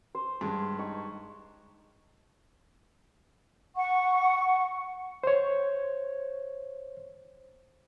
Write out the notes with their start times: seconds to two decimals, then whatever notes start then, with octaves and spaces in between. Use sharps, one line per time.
0.15 C5
0.41 G2 G#3
0.79 D#4 C#6
3.75 F#5 C#6
5.24 C5 C#5